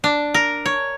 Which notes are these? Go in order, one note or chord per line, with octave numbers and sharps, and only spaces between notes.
D4
A#4
C#5